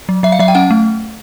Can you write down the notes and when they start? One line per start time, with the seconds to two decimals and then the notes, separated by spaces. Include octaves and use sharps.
0.09 F#3
0.23 F#3 E5
0.32 F5
0.39 F#3 E5
0.48 G5
0.55 C#4 F#5
0.71 A3